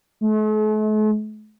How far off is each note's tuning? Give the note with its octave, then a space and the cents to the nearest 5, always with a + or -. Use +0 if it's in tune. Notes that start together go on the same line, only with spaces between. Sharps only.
A3 -45